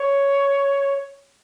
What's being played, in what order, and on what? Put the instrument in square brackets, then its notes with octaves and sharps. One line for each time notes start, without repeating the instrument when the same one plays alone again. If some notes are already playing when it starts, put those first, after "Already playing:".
Already playing: [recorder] C#5